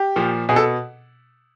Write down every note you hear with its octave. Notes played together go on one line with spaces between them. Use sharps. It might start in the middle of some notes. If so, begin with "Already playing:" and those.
Already playing: G4
A#2 F3
B2 G#4
A4